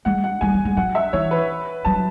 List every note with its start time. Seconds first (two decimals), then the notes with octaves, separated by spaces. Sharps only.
0.05 G#3 F#5
0.24 F#5
0.41 G#3 G#5
0.54 F#3
0.65 G#3
0.77 F#3 F#5
0.95 E5
1.13 E3 C#5
1.31 B4
1.85 F#3 A5